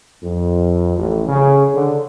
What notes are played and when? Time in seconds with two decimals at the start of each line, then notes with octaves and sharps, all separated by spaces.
0.23 F2
0.98 A1
1.28 C#3
1.75 D3